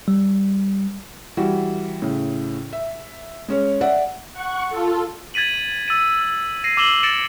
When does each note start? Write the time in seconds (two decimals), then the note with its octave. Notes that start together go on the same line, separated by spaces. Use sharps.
0.08 G3
1.37 E3 G3 F#4
2.02 A2 C#3
2.73 E5
3.48 G#3 C#4 C#5
3.81 D5 E5 F#5
4.33 F#5 C#6
4.70 F4 A4
5.34 G#6 A6 B6 D#7 F#7
5.88 E6 A6 D#7
6.21 E6
6.64 A#6 C7 D#7
6.77 D6 E6 E7 F#7 G7
7.03 A6 A#6 C#7 D7 E7